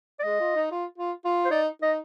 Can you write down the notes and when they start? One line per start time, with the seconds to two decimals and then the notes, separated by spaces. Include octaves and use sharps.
0.19 D5
0.24 G#3 D#5
0.40 F4
0.56 D#4
0.71 F4
0.98 F4
1.25 F4
1.45 C5
1.51 D#4 D5
1.82 D#4 D#5